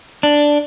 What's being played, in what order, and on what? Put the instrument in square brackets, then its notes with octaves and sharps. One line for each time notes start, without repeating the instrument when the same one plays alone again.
[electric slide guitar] D4